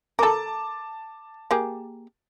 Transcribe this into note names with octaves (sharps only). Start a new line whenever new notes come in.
A4 A#4 A5 D6
A#3 G4 G#4